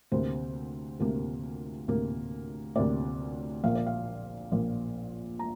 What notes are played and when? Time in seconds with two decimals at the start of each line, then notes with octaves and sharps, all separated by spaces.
0.12 D2 C3 A#3 C5
1.00 D2 C3 A#3 A#4
1.88 D2 C3 A#3
2.75 D2 C3 A#3 D5
3.64 A#1 A#2 A#3 F5
3.75 D5
3.87 F5
4.52 A#1 A#2 A#3
5.39 A#5